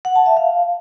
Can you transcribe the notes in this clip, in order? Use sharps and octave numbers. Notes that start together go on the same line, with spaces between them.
F#5
A5
E5
F5